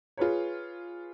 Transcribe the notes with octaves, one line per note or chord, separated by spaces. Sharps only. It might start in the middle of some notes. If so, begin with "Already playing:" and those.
F4 G#4 B4 C#5